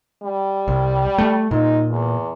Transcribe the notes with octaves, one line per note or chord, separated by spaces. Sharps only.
G3
C2
A3
A#2 D#4
E2